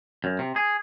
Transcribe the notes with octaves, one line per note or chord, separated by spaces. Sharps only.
F#2
C3
G#4